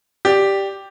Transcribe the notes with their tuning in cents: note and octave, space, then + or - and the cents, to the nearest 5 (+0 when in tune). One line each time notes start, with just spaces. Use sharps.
G4 +0 D5 +0